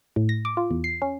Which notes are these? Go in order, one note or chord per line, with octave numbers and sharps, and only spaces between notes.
A2
A#6
D6
F4
E2
C7
C#4